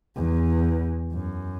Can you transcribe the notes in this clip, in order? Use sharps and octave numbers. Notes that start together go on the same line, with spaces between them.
E2
F#2